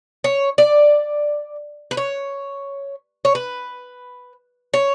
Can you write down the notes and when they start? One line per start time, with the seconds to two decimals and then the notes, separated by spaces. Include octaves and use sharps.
0.24 C#5
0.58 D5
1.91 B4
1.97 C#5
3.25 C#5
3.35 B4
4.74 C#5